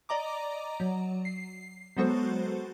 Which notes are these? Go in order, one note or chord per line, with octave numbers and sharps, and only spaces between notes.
D5 D#5 A#5 D6
F#3
C7
F#3 G#3 B3 F#4 A4 C5